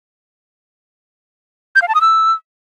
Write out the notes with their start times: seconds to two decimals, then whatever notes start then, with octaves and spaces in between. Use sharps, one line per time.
1.76 G6
1.82 F5
1.88 A5
1.95 D#6
2.01 E6